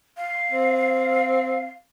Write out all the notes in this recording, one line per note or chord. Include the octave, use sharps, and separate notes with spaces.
F5
C4